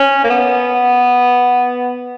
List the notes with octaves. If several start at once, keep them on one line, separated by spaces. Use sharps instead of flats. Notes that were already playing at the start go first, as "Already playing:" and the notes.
Already playing: C#4
A#3
B3